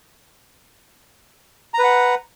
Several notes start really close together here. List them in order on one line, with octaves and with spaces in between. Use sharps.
A#5 B4 F#5